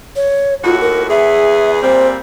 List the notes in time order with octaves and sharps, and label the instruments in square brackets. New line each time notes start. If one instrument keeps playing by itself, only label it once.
[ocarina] C#5
[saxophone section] D#2 A2 F#4 [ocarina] F4
[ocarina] A#4
[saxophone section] E2 B3 G#4 [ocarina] E5
[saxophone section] A#2 G3 C4 [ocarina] C5